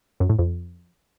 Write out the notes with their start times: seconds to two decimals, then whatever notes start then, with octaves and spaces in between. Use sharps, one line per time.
0.20 F#2
0.29 A2
0.39 F2